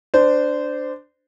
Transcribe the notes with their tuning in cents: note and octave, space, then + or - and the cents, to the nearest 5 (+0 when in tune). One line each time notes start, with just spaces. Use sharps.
D4 +0 C5 -20